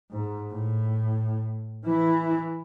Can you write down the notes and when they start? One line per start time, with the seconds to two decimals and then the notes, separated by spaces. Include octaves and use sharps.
0.11 G#2
0.52 A2
1.85 E3 E4